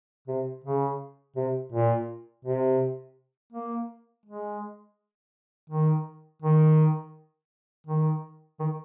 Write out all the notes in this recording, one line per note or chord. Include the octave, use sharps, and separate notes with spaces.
C3
C#3
C3
A#2
C3
A#3
G#3
D#3
D#3
D#3
D#3